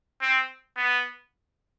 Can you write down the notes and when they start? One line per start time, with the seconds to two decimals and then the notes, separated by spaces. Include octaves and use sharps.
0.21 C4
0.77 B3